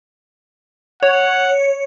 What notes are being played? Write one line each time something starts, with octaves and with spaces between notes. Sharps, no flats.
C#5 F#5